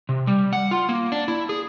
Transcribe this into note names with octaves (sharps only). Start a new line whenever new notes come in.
C3
G3
F#5
F4
A#3
D4
E4
G#4